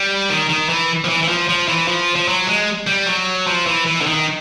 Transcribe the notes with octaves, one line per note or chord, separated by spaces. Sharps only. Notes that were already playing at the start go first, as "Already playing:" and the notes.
Already playing: G3
D#3
D#3
E3
F3
E3
E3
F3
F3
E3
F3
F3
F#3
G#3
G3
F#3
F3
E3
E3
D3
D#3